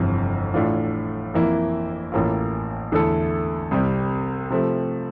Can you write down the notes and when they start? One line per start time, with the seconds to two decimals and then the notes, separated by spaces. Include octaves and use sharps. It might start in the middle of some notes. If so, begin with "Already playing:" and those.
Already playing: G1 F2 C3 E3
0.54 A2 E3 A3 D4 F4
1.34 F2 E3 A#3 E4
2.12 A1 A2 E3 A#3 F4
2.92 E2 D3 A3 E4 A4
3.71 C2 C3 G3
4.50 C3 F3 A3